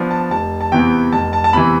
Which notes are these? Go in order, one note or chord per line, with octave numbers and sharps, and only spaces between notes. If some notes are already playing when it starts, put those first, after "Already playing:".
Already playing: F3 B3 D4
A5
F1 A5
A5
E2 C3 E3 B3 G5
F1 A5
A5
A5
E2 C3 E3 B5